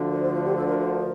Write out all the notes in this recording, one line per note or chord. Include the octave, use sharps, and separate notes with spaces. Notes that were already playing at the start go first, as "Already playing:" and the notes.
Already playing: D2 D3 F3
A#4
C5
F4
G4
A4
A#4
A#4